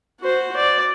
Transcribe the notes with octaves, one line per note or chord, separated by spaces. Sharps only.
F#4 C5
D5